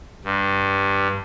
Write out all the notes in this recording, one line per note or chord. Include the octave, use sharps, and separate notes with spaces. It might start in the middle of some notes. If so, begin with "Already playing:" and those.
G2